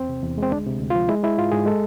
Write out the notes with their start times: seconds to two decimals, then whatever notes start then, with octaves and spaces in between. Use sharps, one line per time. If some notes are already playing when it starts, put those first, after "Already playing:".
Already playing: E2 C4
0.09 C3
0.22 E2
0.38 G#3 C4
0.52 D2 D4
0.66 C3
0.80 D2
0.90 F4
0.95 F3
1.09 G#3 E4
1.23 G#3 E4
1.38 G#2 F4
1.52 G#2 G#4
1.66 G#3 A4